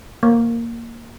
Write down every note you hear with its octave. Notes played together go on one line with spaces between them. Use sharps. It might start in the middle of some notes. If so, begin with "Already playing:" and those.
A#3